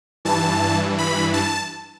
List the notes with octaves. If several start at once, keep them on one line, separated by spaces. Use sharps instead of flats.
G2 E3 A5
B5
A5